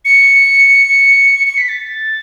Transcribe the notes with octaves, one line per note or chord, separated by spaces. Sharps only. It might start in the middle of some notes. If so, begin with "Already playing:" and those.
C#7
C#7
B6
A6